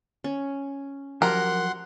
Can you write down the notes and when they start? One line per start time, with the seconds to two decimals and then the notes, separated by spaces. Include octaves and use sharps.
0.24 C#4
1.22 F3 F#3 G4 A#4 F#5 C6